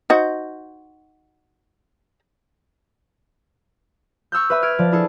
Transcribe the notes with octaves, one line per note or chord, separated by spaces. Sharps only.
D#4 F#4 C5
C#6 E6 F6 G6
B4 E5 B5
F6 G#6 D7
F3 D5
D4 E4 G#4 A4